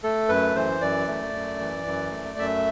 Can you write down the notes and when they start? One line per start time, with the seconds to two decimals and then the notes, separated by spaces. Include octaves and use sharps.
0.03 A3 A4
0.29 F#2 B4
0.55 E3 C5
0.81 F#2 D5
1.07 A3
1.34 F#2
1.60 E3
1.87 F#2
2.11 A3
2.39 F#2 E5